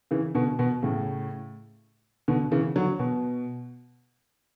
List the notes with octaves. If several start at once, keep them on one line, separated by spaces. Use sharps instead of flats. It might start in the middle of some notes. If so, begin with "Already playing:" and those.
C#3 E3
B2 D3
B2
A2 C#3
B2 D3
C#3 E3
D3 F#3
B2